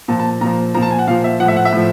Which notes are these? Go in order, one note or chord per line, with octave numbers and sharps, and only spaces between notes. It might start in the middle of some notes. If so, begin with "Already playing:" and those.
A#2 F3 A5
A5
A#2 F3 A#5
A#2 F3 A#5
A5
G#5
F#5
A#2 F3 F5
E5
F3 F#5
A2 E5
F#5
E5
A2 F3